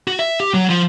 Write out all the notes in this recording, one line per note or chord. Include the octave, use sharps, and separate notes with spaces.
F#4
E5
G4
F#3
F3